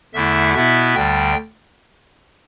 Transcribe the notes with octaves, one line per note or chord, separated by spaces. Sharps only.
E2 D3 A3 E4 E5
B2 B3 E4 E5
D2 D3 G3 G5